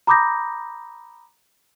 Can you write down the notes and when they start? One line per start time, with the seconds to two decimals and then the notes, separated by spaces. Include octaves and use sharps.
0.07 A#5 B5 D6 D#6 G6 A#6